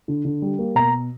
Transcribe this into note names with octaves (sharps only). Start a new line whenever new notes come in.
D3
D3
G3
A#3
B2 A#5